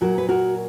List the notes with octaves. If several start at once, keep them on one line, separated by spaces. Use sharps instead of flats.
A#2 F#3 F#4 A#4
B4
F#4 A#4